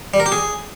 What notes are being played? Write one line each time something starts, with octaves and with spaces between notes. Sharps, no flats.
G3
A#4
G4
G#4